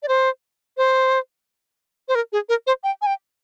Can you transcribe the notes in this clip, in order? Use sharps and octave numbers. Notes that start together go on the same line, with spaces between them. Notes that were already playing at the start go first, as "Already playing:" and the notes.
D5
C5
C5
C5
A#4
G#4
A#4
C5
G5
G#5
G5